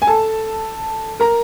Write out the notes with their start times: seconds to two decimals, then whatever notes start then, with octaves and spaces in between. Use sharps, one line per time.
0.02 G#5
0.07 A4 A5
1.20 A#4 A#5